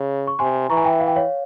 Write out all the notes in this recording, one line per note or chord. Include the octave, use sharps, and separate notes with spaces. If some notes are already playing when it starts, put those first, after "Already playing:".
Already playing: C#3
C#6
C3 G#5 C6
E3 A#5 C#6
G#5
E5 G5
F5
G5
C#5 F5